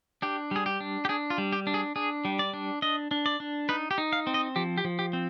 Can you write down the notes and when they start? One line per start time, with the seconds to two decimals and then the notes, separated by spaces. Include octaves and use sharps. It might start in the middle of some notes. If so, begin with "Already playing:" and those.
0.22 D4 G4
0.51 G3 G#4
0.66 G4
0.80 D4
1.05 G4
1.09 D4 G#4
1.30 F4
1.38 G3
1.53 G4
1.67 D4
1.74 G#4
1.96 D4 G#4
2.25 G3
2.39 D5
2.54 D4
2.82 D4 D#5
3.11 D4
3.26 D5
3.40 D4
3.69 D#4 B4
3.91 G4
3.98 D#4
4.13 F5
4.27 C4
4.34 D#5
4.56 F3 G4
4.78 G4
4.85 F3
4.99 G4
5.13 C4